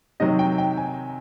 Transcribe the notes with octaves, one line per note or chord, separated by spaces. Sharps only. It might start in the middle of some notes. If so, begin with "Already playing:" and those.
C3 D#3 F#3 D#5
G5
G5
G#5